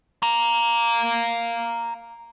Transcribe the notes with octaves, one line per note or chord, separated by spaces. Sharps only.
F5 A#5